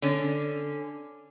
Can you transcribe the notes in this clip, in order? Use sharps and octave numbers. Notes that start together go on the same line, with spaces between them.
D3 C#4